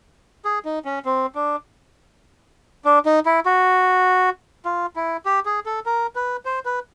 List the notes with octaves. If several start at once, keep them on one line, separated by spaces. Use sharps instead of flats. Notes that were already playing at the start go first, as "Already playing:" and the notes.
G#4
D#4
C#4
C4
D4
D4
D#4
E4
F#4
F4
E4
G4
G#4
A4
A#4
B4
C5
B4